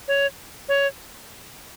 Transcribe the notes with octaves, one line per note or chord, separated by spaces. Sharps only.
C#5
C#5